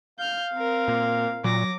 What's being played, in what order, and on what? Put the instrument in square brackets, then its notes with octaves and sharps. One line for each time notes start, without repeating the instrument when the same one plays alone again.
[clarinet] F5 [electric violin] F6 G6
[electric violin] C4 A#4
[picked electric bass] A#2
[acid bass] A#2 [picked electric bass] F#3 [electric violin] D6 A#6